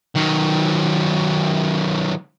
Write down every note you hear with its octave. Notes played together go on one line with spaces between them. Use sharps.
D#3 F#3